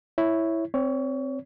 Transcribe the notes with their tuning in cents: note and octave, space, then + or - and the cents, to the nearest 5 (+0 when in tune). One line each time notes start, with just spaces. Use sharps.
E4 +0 C#5 +0
C4 +0 C#5 +30